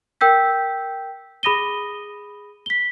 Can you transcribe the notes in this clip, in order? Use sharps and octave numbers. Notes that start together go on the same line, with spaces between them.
A#4 G5 E6 G6 B6
G#4 B5 D#6 A#6 D#7 G7
B6 G7